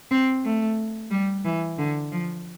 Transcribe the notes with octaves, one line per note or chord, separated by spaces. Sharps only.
C4
A3
G3
E3
D3
F3